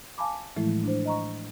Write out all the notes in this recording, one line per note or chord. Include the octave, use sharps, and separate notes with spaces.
F5 G#5 A5 B5 D6
A2 E3 F3 G#3 A3 E4
D4 C5
D#5 A#5 C#6